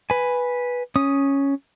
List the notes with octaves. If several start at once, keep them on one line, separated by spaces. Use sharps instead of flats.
B4 G#5
C#4 D#6